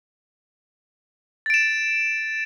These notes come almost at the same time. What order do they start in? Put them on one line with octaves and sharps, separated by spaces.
A6 D7 E7